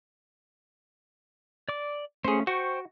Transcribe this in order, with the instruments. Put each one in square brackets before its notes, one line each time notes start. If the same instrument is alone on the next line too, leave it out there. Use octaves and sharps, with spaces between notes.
[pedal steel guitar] D5 D6
[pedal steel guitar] A3 C#4 [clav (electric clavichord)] G#4 C5
[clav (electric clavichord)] F#4 [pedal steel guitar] C5 G5 C#6